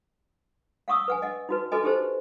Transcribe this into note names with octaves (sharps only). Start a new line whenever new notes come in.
F5 F#5 C#6 D#6 E6
B4 F#5 G#5
D#5 F#5
D#4 F#4 B4
F#4 A4 B4 D#5 G#5
D#4 G4 A4 B4 C5